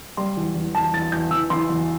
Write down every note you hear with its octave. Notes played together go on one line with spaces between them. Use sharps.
G3 C6
E2
E2
E2 A5
E2 A6
E2 G6
E3 E6
E3 C6
E2